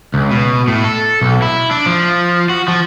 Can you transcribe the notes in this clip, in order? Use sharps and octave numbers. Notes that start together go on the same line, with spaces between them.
C#2
B2
A2
A4
B1
E4
D4
F3
F#4
F3